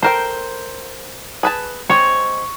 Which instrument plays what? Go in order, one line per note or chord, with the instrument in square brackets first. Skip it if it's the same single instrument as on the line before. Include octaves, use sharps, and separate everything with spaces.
[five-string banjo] A4 A#4 G5 [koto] C5
[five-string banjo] G#4 B4 A5
[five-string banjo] G#3 C4 [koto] C#5